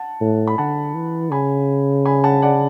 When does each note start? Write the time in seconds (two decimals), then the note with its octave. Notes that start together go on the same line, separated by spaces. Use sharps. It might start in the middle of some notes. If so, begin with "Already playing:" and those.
Already playing: F#5 A5
0.21 A2
0.47 B5
0.58 D3 F#5 A5
0.95 E3
1.31 C#3 G#5 B5
2.06 G#5 B5
2.24 F#5 A5
2.42 D5 F#5